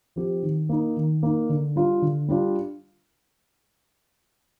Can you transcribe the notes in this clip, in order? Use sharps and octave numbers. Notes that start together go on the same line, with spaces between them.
F3 C4 G4
D#3
A#3 D#4
D#3
A#3 D#4
D3
G3 D4 F4
D3
G3 D4 F4